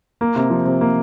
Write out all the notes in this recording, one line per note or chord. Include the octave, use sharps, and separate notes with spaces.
A#3
C3
F3
C3
A#3